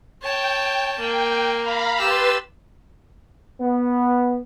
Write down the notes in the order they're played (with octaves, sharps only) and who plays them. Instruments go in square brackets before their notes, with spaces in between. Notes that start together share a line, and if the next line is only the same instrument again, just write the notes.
[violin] C#5 A5 [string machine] G5
[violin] A#3 [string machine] G5
[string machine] F5 A#5 B5
[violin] G4 E6 [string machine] B4 C6 A6
[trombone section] B3